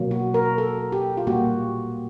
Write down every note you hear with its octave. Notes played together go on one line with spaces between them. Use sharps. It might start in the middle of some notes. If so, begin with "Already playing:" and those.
Already playing: B2 F#3 A#3
F#4
A#4
A4
G4
F4
A#2 G3 A#3 F#4